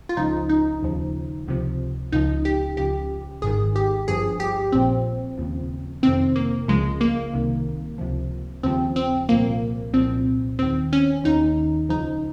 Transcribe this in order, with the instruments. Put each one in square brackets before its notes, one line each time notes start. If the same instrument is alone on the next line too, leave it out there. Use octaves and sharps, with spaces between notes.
[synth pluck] F4
C#2 C#3 F3 D#4
D#4
D#2 C#3 F3
C#2 C3 F3
C#2 C#3 F3 D#4
G4
C#2 C#3 F3 G4
G#1 G#2 D#3 G#4
G4
G1 G2 F3 G#4
G4
A#1 A#2 F3 C4
D#2 C#3 F3
F2 C3 D#3 C4
A#3
C#2 C#3 F3 G#3
A#3
C2 C3 D#3
C#2 C3 F3
D#2 C#3 F3 C4
C4
C2 A#2 F3 A#3
C2 A#2 F3 C4
D#2 D#3 C4
C#4
D#2 D#3 D#4
C#2 C#3 F3 D#4